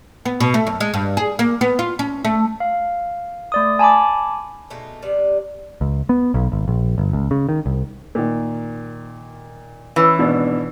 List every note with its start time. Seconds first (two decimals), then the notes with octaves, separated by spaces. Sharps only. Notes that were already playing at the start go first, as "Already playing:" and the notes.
0.25 B3
0.40 B2
0.54 A3
0.67 F#2
0.80 G#3
0.94 G2
1.17 G#4
1.39 A#3
1.61 B3
1.79 F4
1.99 C#4
2.25 A3
2.60 F5
3.52 A3 D5 D#6
3.79 G#5 A5 B5 D6
4.70 B2 G#3 A3 D#4
5.02 C3 G3 B3 D5
5.81 C#2
6.09 B3
6.34 B1
6.52 G#1
6.68 A#1
6.98 G1
7.13 C#2
7.31 C#3
7.49 D#3
7.66 C2
8.15 A#2 D#3
9.96 E3 C#4
10.19 G#1 B2 D4